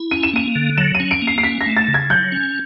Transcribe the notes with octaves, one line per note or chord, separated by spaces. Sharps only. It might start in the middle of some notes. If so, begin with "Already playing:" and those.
Already playing: E4
C#4 D#7
E7
A#3 D#7
D3
F#3 E7
D#7
C#4
D7
A#3
C7
C7
C#4 B6
A#6
A3
A6
C#3
G#6
F#3 G6
C#4